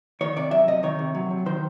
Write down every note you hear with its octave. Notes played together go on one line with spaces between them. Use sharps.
D#3 C#5
C3 D5
F#3 E5
C3 D#5
D#3 C#5
C3
F#3
C3
D#3 C5